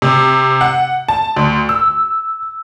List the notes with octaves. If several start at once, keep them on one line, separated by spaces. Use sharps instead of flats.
C3
F#5
A5
D2
E6